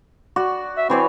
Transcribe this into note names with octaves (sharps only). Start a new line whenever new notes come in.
F#4 D5
E5
E3 C4 C#5 D5